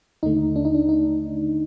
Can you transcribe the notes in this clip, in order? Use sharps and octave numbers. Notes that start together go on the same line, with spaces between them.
D#2 D3 A3 D#4
D4
D#4
D4
D#4